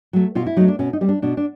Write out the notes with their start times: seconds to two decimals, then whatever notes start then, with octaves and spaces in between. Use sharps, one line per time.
0.13 F#3 A3
0.35 B2 F4
0.47 E4
0.57 F#3 A3 D#4
0.68 D4
0.79 B2 C#4
0.93 D#4
1.01 G3 C4
1.09 D4
1.22 B2 D4
1.37 D4